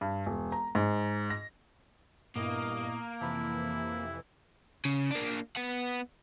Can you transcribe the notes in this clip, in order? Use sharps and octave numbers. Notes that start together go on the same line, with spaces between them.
G2
E1
A#5
G#2
A#6
G2 A#2 A#3 B3 E4 D#5 D#6
F2 C3 E3 E4 A5 B5
C#3
A#3 D4
B3 F#5